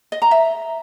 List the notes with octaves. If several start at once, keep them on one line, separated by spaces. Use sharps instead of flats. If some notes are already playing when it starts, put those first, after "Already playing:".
D#5
A#5
E5